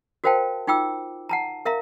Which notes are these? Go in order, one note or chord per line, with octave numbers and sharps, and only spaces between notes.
F#4 A#4 C5 F5 G5 A5
D#4 F4 G5 D6 E6
F#5 A5 A#5
A#4 E5 F5 A#5